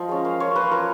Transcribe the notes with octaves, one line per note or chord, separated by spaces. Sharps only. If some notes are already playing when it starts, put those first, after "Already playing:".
Already playing: F3 D#5
G#3 C#4
A#3 F5
F4 C#5
A#3 B4
F4 A#4